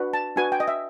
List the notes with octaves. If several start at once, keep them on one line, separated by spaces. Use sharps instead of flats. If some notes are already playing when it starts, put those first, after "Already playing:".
Already playing: D4 F#4 B4
A5
D4 F#4 B4 G#5
G5
D#5
E5